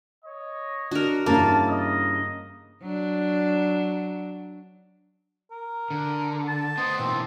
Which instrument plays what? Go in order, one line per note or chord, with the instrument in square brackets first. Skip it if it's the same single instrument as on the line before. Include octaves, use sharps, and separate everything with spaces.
[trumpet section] C#5 D#5
[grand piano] D4 [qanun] F#4 A#4
[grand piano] G2 C#3 E3 [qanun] A#3 A#4 [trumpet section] A5
[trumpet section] D#5
[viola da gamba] F#3 D4
[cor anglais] A#4
[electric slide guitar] D3
[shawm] A5
[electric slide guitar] B3 C5 [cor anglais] D#5
[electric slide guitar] B2 E3 A#3 [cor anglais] C4